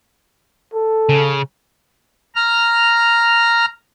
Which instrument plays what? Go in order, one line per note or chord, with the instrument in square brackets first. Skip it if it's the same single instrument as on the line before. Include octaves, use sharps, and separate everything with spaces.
[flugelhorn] A4
[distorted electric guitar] C#3
[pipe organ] A#5 F6